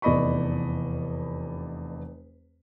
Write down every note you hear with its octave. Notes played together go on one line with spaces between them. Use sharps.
F1 E2 D5 D#5 B5 C#6